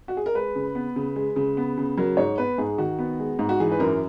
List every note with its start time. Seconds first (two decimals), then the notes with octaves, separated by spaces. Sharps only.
0.08 F#4
0.17 G#4
0.26 A#4
0.35 G#3 B4
0.55 C#3
0.75 B3
0.96 C#3
1.16 G#3
1.36 C#3
1.57 B3
1.77 C#3
1.97 F#3 A#4
2.17 G#2 C#5
2.38 B3 B4
2.58 G#2 G#4
2.78 D#3 F#4
2.99 B3
3.19 G#3
3.39 G#2
3.49 F#4
3.60 E3 G#4
3.72 B4
3.80 F#2 A#4